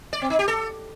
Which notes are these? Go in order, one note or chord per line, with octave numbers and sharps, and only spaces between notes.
D5
C4
D#4
G4
A4